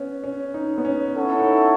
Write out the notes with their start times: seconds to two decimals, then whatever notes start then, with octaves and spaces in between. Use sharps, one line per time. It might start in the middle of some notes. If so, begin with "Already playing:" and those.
Already playing: B3 C#4
0.24 C#4
0.54 D#4
0.78 B3
0.85 C#4
1.16 C#4 E4 A4 C#5 F#5
1.39 D#4